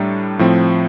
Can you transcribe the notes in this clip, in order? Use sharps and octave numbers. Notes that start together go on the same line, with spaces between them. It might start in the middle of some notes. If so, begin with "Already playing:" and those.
Already playing: A2 G3 D4 A#5
A2 F3 C4